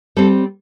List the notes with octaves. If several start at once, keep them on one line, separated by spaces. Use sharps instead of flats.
G3 C4 A4